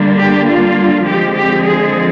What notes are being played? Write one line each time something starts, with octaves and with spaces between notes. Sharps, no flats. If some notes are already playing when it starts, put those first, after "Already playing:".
Already playing: D3 G3 A#3 D4
G4
F4
D3 F3 G#3 C4 G4
G4
G#4